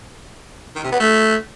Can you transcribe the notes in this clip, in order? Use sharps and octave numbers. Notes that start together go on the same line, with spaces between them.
D#3
C3
B3
A3